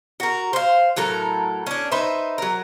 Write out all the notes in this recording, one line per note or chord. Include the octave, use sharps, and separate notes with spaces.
F#4 A#4
C5 F5
A2 F#3 A4 A#4
C#4 D4
D#4 B4 C5 E5
F#3 A#4